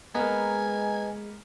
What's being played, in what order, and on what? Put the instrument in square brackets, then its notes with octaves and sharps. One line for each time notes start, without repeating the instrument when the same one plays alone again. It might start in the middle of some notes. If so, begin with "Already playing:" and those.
[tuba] G#3 [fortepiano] A#3 B3 [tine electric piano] B4 D#5 A#5 [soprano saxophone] G#5